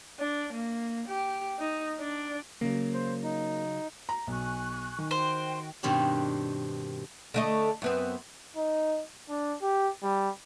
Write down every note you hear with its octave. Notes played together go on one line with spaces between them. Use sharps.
D4
A#3
G4
D#4
D4
C#3 F#3 A#3
C5
D#4
A#5
B1 G#5 C#6 F#6
D#3
F#4 C5 G5
G2 B2 D#3 C4 D4 G4
D3 A3 D#5
F#2 B3 C4
D#4
D4
G4
G3